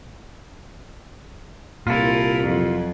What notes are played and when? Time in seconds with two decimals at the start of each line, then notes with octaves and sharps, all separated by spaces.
1.87 C2 A#2 E4 F4 A4 A#4
2.44 F2 F#3